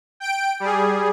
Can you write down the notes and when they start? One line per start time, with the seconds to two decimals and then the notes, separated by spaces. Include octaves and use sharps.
0.20 G5 D7
0.60 G3 G#4